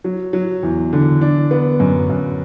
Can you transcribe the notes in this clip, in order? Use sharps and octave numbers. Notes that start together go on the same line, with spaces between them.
F#3
F#3
E2
D3
D4
B3
F#2
F#2